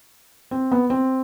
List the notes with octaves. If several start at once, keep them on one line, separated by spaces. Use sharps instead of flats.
C4
B3
C4